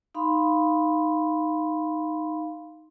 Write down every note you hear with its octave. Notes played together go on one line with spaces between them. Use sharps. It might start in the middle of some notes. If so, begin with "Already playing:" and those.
D#4 F5 B5 C6